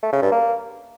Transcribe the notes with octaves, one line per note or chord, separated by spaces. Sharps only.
A3
C#3
G2
A#3